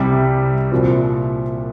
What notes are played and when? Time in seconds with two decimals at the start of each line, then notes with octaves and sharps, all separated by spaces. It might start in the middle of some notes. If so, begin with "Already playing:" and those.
Already playing: C2 C3 G3
0.71 C2 A#2 F3 C4